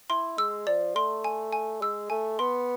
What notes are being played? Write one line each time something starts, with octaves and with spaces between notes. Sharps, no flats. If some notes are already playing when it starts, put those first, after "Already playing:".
E4 C6
G#3 E6
F3 D5
A3 C6
G#5
G#5
G#3 E6
A3 G#5
B3 C6